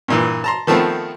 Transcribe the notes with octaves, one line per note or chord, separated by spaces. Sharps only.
G2 A#2 E3
A5 A#5 C6
D#3 F3 A3 B3 C4